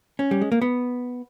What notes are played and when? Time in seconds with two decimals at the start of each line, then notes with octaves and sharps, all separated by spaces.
0.19 C#4
0.31 G3
0.41 G#3
0.52 A#3
0.62 B3